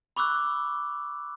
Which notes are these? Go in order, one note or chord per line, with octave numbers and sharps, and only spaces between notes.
B5 C#6 D6 E6 F#6